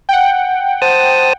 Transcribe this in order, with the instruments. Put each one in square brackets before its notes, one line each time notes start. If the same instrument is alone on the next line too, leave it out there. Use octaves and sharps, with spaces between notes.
[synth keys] F#5 G5
[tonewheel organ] C5 A5 D#6